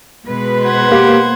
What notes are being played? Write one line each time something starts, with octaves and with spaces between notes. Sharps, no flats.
B2 G#3 B4
C5 F#5 G#6
A#3 G4